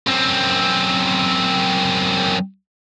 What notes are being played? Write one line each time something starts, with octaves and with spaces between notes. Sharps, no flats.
F#2 C4